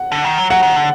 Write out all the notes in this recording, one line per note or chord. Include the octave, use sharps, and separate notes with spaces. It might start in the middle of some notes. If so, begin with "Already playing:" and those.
Already playing: F#5
D3
D#3
F#3
F#3 F#5
D#3
D3